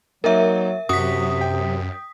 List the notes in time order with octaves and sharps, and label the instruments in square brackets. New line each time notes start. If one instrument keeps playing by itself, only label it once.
[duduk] F#3 [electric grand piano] A#3 D#4 [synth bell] A#4 E5
[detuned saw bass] F#2 [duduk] C3 [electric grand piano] F#4 [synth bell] D#6 B6
[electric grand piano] G5